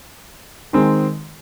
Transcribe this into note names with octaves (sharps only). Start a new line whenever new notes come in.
D#3 G#3 C4